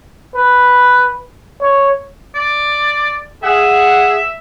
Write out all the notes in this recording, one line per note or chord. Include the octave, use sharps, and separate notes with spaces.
B4
C#5
D5
G#4 E5 F#5